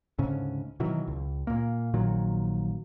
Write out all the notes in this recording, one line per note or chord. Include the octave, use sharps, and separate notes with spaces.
D2 G#2 C#3 C#4
B2 D#3 E3 F#3
C#2
A#2 A#3
A#1 A#2 D#3 F#3